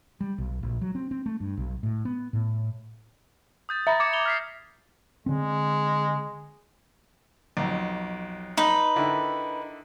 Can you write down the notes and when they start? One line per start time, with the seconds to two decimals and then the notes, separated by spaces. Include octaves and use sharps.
0.21 G3
0.38 B1
0.63 A#1
0.81 F#3
0.95 C4
1.11 C4
1.26 A3
1.40 G2
1.57 B1
1.83 A2
2.05 B3
2.33 A2
3.69 D#6 G6 A6
3.87 E5 A#5 B5 A6 A#6
4.00 D6 G#6 C#7 E7
4.13 F7 G7
4.26 F6 B6 C7
5.26 D3 G#3 C4
7.57 B1 F2
8.57 D#4 B4
8.96 D3 D#3 E4